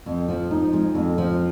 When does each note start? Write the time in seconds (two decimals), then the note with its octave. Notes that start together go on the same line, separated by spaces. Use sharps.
0.06 F2
0.28 F3
0.51 D#4
0.73 G#3
0.95 F2
1.18 F3